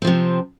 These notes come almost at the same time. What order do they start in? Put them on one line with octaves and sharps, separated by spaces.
C4 F3 C3